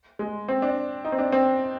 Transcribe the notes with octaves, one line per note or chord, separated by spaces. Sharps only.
G#3
C4
D4
D#4
C4
D4
C4